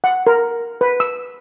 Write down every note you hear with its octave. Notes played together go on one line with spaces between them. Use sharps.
F#5
A#4
B4
E6